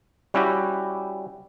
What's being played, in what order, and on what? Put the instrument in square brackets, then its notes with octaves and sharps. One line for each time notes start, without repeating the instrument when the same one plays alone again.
[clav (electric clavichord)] G3 C#4 E4 F#4 G4